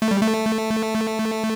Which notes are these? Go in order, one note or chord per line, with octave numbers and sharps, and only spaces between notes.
A3
G3
A3